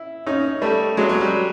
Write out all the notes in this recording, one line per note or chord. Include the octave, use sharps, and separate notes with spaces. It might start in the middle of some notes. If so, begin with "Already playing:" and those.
Already playing: E4
C#4 D#4
G3 A3
F#3 G#3
F#3
G3